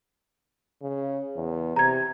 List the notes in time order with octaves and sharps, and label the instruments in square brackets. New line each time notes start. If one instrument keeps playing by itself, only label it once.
[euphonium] C#3
E2
[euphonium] C3 [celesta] A#5 G#6